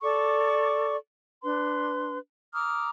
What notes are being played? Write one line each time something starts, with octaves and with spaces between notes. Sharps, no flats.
A4 D5 C#6 D6
D4 B4 C6
A#5 D6 D#6 F6